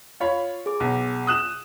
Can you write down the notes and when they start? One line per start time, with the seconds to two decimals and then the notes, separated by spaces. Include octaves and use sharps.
0.20 F4 C#5 B5
0.66 G#4 D6
0.80 B1
1.27 D#6 F#6 E7